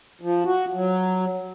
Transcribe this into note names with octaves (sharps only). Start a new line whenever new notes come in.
F3
F#4
F#3